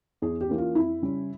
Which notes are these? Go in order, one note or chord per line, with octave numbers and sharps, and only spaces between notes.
E2 G#4
G4
E3 A#3 C#4
F4
F2 E4
C#3 G3 C#4